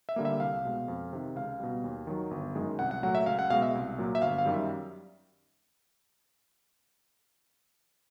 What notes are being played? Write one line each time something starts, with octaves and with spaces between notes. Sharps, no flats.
E5
D3 G3 A#3
E5
C2 F5
B2 G#3
F2
C3 D#3
C#2 F5
B2 G3
D#2
D#3 F#3
G1
F#2 D#3 G#3
C2 F#5
F#5
A#2 F#3 A3 F#5
E5
C#2 F5
F#5
B2 G#3 F5
E5
C2
A#2 F#3 A#3
E5
G1 F5
F5
F#2 D#3 G3
E5